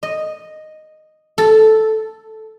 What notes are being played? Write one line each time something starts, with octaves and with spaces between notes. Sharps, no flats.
D#5
A4